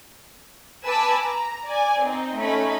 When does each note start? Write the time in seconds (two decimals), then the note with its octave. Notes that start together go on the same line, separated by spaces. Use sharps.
0.84 B4 G#5 A5 B5 D6 E6
1.22 A#5
1.64 D5 G#5
2.00 C4 D#4
2.36 A3 C#4 D#4 B5